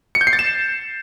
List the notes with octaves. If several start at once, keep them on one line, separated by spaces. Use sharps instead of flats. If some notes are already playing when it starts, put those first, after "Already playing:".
C#7
G6
C7
A6
E7